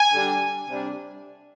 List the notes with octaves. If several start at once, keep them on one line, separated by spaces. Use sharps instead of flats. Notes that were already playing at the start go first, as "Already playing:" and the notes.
Already playing: G#5
D3 G3 D4
C3 G3 D4